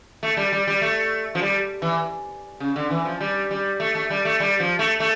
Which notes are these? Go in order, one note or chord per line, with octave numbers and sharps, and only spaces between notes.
A3
G3
G3
G3
A3
F3
G3
E3
C#3
D3
E3
F3
G3
G3
A3
A3
G3
A3
G3
F3
A3
A3